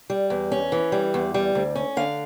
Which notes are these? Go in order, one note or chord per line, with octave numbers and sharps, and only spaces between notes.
G3
E2
C#4
E3
G3
E2
G3
D2
C#4
D3 F5